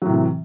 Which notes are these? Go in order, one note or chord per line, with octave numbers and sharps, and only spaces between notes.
A2 C3 E3 F#3